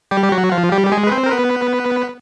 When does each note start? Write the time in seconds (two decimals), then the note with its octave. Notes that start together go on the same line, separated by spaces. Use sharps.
0.11 G3 G4
0.23 G4
0.32 F#3 F#4
0.52 F3 F4
0.72 G3 G4
0.86 G4
0.92 G#3 G#4
1.07 B4
1.12 C4 C5
1.26 A#4
1.32 B3 B4